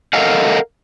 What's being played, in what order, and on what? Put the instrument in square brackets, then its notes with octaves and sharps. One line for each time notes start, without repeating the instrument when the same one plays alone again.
[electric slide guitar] A4 A#4 D#5 F5 F#5